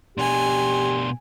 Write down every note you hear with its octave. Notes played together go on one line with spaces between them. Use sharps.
B2 D4 G4 G#5 C6